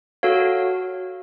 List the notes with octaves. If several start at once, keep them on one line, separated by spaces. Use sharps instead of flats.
F#4 A4 C#5 F5